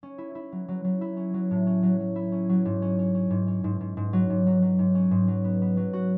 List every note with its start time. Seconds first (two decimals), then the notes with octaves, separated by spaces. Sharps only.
0.03 C#4
0.18 E4
0.35 E4
0.52 F#3
0.68 F#3
0.84 F#3
1.01 E4
1.17 C#4
1.34 F#3
1.51 A2
1.67 C#4
1.83 F#3
2.00 F#3
2.16 E4
2.32 C#4
2.49 F#3
2.65 G#2
2.82 C#4
2.99 C#4
3.15 C#4
3.30 G#2
3.47 C#4
3.64 G#2
3.80 G#2
3.97 G#2
4.13 F#3
4.30 G#2
4.47 F#3
4.62 F#3
4.79 G#2
4.95 C#4
5.11 G#2
5.28 F#3
5.44 B3
5.62 B3
5.77 F#3
5.93 F#4